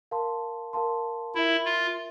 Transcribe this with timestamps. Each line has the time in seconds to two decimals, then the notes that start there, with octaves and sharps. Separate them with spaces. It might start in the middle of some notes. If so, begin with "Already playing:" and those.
0.11 A#4 F5 A5 C6
0.73 A#4 F5 A5 C6
1.34 E4 F4 A#4 E5
1.65 F4